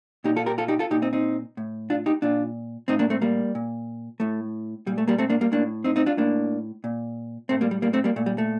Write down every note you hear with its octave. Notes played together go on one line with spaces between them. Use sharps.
A#2 D#4 G4
F4 A4
G4 A#4
F4 A4
D#4 G4
F4 A4
A#2 D#4 G4
C4 D#4
C4 D#4
A2
D4 F4
D#4 G4
A#2 D4 F4
A2 C4 D#4
A#3 D4
A3 C4
G3 A#3
A#2
A2 A3
A#2 G3
A3
G3 A#3
A3 C4
A#3 D4
G3 A#3
A2 A#3 D4
C4 D#4
C4 D#4
D4 F4
A2 A#3 D4
A#2
A2 A3 C4
G3 A#3
G3
G3 A#3
A3 C4
G3 A#3
A#2 A3
G3
A3